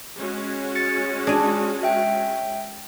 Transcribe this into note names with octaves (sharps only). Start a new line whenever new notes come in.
G#3 C#4 F#4
A6 C#7
D4 G#4 G#5
E5 G5